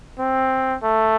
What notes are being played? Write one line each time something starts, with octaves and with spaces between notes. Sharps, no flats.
C4
A3